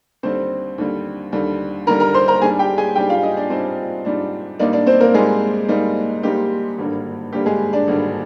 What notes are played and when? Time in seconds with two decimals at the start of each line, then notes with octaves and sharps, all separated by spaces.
0.23 D#2 D3 G3 C4 C5
0.78 D#2 D3 G3
1.32 D#2 D3 G3
1.87 D#2 D3 G3 A#4 A#5
2.00 A#4 A#5
2.14 C5 C6
2.28 A#4 A#5
2.41 G#2 G3 D4 G#4 G#5
2.59 G4 G5
2.77 G#4 G#5
2.95 G#2 G3 D4 G4 G5
3.09 F4 F5
3.23 D#4 D#5
3.37 D4 D5
3.50 G#2 G3 C4 D4 C5
4.05 G#2 G3 D4
4.60 G#2 G3 A#3 D4 D#4 D5
4.73 D4 D5
4.87 C4 C5
5.00 A#3 A#4
5.14 G#2 G3 G#3 A#3 D#4 G#4
5.68 G#2 G3 A#3 D#4
6.23 G#2 G3 A#3 D#4 G4
6.78 G#1 G2 D3 G3 A#3
7.32 G#1 G2 D3 G3 A#3 G4
7.46 G#3 G#4
7.73 D4 D5
7.88 G#1 G2 D3 G3 A#3